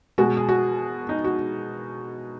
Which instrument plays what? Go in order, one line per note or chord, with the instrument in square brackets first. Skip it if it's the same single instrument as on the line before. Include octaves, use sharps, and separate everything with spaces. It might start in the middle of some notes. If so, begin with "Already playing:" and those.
[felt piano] B2 G#3 F#4
G#4
F#4
D#4
F#4